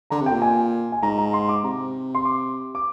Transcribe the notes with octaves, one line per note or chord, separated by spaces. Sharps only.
D3 A#5
C3
G5
A#2
G#5
G#5
G#2 A#5
A#5
C6
D6
C3 A#5
C6
D6
D6